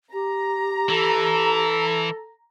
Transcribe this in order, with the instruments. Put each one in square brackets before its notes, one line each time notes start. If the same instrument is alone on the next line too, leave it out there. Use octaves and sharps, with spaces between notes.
[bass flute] G4 [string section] A#5
[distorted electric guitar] E3 [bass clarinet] A4